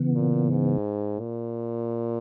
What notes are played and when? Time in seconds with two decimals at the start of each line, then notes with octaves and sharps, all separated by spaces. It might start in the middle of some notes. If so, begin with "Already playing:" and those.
Already playing: C#3 E3 B3
0.14 A#2
0.50 G#2
1.20 A#2